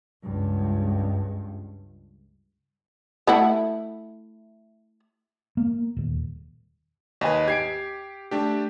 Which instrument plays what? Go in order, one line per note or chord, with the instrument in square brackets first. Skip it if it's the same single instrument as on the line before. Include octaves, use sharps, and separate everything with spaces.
[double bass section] C#2 G2
[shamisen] A3 E4 F#5
[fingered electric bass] A#3
D#1
[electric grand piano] D#2 B4 [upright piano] D#5 G#5
[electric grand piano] G4 [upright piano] G#6 C7 D7
[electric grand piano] A3 D4 G4